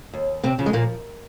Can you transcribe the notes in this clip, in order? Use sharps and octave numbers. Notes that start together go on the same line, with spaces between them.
D#2
C3 C4
C#3 F3
G#3
A#2 A#3